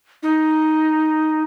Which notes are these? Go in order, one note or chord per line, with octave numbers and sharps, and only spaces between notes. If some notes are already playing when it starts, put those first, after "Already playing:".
D#4